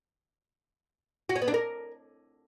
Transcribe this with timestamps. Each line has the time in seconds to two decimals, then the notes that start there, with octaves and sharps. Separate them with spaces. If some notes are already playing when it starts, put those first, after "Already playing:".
1.29 F#4
1.36 C#4
1.42 B3
1.48 D4
1.54 A#4